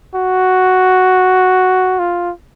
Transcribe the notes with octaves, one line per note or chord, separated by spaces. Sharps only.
F#4
F4